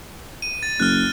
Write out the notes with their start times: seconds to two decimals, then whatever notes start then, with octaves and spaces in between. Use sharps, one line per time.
0.42 D#7
0.63 A6
0.80 F#1 F6 F#6